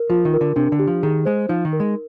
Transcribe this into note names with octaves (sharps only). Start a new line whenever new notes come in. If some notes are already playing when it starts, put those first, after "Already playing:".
Already playing: A#4
F3 F4
D#3
A#4
D3
C3 D4
D3
G4
F3
D#3 G#4
G#3 C5
F3 D#4
D#3
A#4
G#3